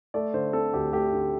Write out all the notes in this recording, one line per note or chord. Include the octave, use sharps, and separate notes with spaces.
A3 D5
D3 C5
C4 A4
D2 G4
A3 G4
D3